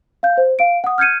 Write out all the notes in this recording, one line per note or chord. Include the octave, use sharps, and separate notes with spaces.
F5 G6
C5
F5 D7
F#5 D#6
F6 G6 G#6 C#7 D#7